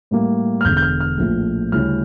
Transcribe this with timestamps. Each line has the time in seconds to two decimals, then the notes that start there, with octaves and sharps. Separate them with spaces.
0.11 A2 G3 A#3
0.61 F6
0.65 E1 E2 D3 G6
0.77 G6
0.82 F6
1.00 F6
1.18 A#1 A2 F3 A3
1.72 D2 C#3 G3 C#4 E4 F6